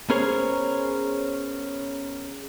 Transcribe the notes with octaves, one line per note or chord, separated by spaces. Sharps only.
B3 C#4 G#4 A#4 C5 C#5